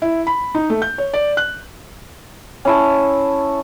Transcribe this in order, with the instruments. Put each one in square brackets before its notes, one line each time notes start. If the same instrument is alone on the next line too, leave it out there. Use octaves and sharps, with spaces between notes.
[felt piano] E4
B5
D#4
A3
G6
C#5
D5
F#6
[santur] C#4 E4 A5